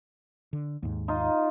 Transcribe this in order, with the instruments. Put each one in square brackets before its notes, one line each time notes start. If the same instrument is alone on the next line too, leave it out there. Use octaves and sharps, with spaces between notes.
[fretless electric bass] D3
D#2 G#2
[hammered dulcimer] D#4 F4